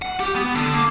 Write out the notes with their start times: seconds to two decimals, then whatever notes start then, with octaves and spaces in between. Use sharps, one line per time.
0.02 F#5
0.20 G4
0.36 B3
0.55 D3
0.73 A#3